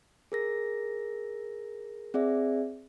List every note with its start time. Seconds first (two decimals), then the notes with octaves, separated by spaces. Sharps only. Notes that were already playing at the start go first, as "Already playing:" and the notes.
0.32 G#4 A#4 A#6
2.14 C4 G#4 D5 E5